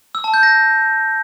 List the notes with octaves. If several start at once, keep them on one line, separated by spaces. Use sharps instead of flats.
E6
A5
G6
A#6